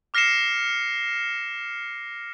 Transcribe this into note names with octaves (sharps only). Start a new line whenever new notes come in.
D6 F6 A#6 C7 C#7 E7